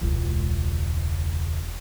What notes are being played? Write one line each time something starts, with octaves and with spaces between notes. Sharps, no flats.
E1 C#2